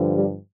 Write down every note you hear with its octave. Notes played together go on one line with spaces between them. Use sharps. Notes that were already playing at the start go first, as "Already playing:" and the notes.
Already playing: G2 D3 F3
G3